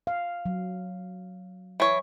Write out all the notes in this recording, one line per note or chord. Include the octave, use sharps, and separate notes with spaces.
F5
F#3
E3 C#5